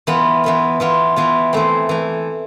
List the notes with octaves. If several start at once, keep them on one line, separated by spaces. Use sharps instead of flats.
E3 B3 F4
E3 B3 F4
E3 B3 F4
E3 B3 F4
E3 A3 C4
E3 A3